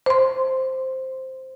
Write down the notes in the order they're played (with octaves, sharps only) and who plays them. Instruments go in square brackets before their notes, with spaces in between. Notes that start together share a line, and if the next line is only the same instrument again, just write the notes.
[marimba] C5 C6